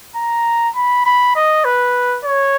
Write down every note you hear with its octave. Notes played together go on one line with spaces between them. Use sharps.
A#5
B5
B5
D#5
B4
C#5